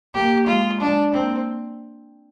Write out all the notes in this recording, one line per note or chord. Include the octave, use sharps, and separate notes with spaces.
A#3 G4
G#3 F4
G#3 D4
A#3 C4